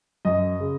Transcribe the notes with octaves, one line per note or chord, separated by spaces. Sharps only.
F#2 D#5
C#3